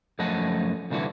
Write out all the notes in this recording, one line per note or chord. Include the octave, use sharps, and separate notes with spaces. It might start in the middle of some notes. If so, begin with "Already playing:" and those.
F#2 F3 A3 D#5 F#5
C2 A#2 D3 E3 F#4